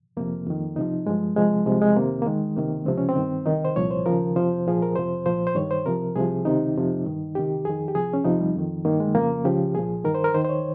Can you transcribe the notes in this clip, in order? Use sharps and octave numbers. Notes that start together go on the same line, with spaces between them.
F2 C3 F3 A#3
F2 D#3
C2 C3 F3 D#4
G2 F3 G#3
C2 C3 F3 G#3
C2 C3 F3 G#3
G#3
F2 C3 D#3 A#3
A#3
D#2 D#3 G#3
C#2 C3 D#3 A#3
C#2 C3 F3 C4
C#4
C4
G2 D#3
C2 C3 D#3 D#4
C5
C2 A#2 F3 C#5
C5
D#2 C#3 F3 A#4
F2 C3 F3 C5
C2 A#2 F3 G#4
A#4
F2 C3 F3 C5
C2 A#2 F3 C5
C5
G2 D#3 C#5
C5
C2 C3 F3 A#4
C2 C3 F3 G#4
C#2 C3 D#3 D#4
F2 C3 F3
G2 D#3
C#2 C3 D#3 G4
F2 D#3 G#4
G4
C2 C3 F3 G#4
C#4
F2 C3 F3 D#4
G3
F2 D#3
G2 D#3 A#3
G#3
F2 C#3 F3 A#3
C#2 C#3 F3 G4
C2 A#2 F3 G#4
G2 D#3 A#4
C5
A#4
D#2 D#3 C5
C5
C#5